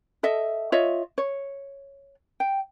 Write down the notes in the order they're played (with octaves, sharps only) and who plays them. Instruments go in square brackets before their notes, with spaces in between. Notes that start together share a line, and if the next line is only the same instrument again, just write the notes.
[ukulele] A4 D#5 E5
F4 C#5 D#5 E5
C#5
G5